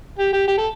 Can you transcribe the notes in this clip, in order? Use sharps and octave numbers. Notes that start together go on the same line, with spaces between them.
G4
G4
G4
A4